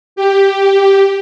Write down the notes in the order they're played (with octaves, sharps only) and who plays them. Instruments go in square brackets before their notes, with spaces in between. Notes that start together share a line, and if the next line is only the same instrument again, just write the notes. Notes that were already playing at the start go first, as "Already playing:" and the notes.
[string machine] G4